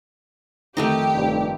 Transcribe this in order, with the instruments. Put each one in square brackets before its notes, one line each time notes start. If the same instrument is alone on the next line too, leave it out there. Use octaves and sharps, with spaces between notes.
[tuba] F2 [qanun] D#3 A3 D#4 [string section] G4
[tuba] F1 [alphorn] G2